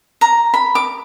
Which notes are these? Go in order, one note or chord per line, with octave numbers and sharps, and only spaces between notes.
A#5
B5
D6